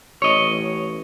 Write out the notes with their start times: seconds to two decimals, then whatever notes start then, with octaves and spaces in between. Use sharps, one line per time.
0.22 A1 C#5 D#5